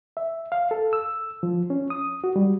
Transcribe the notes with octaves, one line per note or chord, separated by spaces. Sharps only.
E5
F5
A4
E6
F3
C#4
D#6
F#4
G3